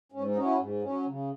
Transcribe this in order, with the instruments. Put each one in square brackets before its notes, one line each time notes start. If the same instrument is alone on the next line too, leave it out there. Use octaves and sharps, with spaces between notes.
[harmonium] G#2 C#4
D#4
F#3 C#4
E4
G#2
F#3 C#4
C#3